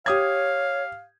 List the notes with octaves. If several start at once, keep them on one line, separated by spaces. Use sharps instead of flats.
G4 C#5 F5 D#6 G#6